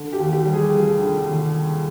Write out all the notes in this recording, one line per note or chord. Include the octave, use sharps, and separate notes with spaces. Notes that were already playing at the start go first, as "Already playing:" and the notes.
Already playing: D3
G4
D#2
G4
G3
G#4
F1
D3
D#2